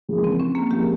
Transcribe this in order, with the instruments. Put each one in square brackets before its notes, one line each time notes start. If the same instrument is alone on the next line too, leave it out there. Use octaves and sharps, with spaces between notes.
[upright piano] E2 C#3 F3 A#3
[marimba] C4
C#4
A#3
[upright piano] C#3 F3 A#3 [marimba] G4